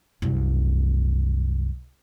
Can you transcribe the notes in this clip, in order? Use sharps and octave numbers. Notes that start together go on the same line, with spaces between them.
C2 F#2